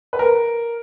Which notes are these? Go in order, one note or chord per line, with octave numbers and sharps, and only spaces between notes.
B4
A#4